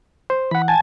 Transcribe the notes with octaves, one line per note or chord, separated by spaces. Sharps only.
C5
E3 F#5 B5
G#5 A5